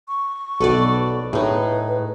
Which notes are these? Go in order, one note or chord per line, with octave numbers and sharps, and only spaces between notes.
C#6
B1 A4 B4 D5
A2 D#4 G#4 B4